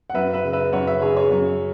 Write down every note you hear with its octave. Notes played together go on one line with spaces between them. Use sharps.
F#5
F#2 B4 E5
B4 E5
C#3
B4 E5
F#2 C#5 F#5
B4 E5
C#3 G#4 C#5
G#4 C#5
F#2